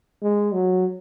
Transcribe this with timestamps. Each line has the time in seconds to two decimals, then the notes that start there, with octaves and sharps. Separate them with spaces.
0.22 G#3
0.52 F#3